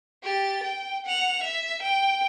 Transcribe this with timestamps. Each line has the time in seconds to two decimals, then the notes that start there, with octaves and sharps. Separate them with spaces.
0.23 G4 A6
0.63 G5
1.06 F#5 F7
1.43 E5
1.82 G5